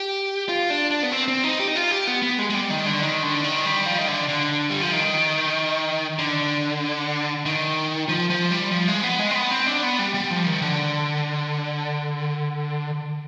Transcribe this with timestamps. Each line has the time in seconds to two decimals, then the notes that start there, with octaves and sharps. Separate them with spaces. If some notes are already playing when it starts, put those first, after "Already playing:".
Already playing: G4
0.49 F4
0.70 D4
0.91 D4
1.03 B3
1.12 C4
1.28 C4
1.44 D#4
1.60 G4
1.68 D#4
1.75 F4
1.91 G4
2.07 B3
2.23 B3
2.39 G#3
2.50 G#3
2.55 G3
2.70 D#3
2.86 D3
3.02 D#3
3.23 D3
3.44 D#3
3.65 G3
3.86 F3
3.98 D#3
4.08 D3
4.29 D3
4.70 G3
4.81 F3
4.92 D#3
6.19 D3
7.46 D#3
8.09 F3
8.30 F3
8.51 G3
8.72 F3
8.88 G#3
9.03 B3
9.19 G#3
9.31 C4
9.35 B3
9.51 C4
9.67 D4
9.83 B3
9.99 G3
10.14 G3
10.30 F3
10.46 D#3
10.62 D3